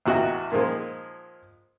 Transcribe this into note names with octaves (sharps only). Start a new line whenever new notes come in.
A1 E2 F#4 D#5 G5
A#2 D#3 F3 G#3